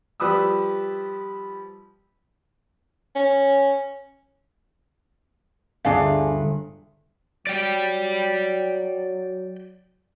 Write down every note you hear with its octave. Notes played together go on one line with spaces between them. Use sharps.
F3 G3 B4 D#6 E6
C#4
G1 D2 D4 G#4 F5
F#3 D5 G5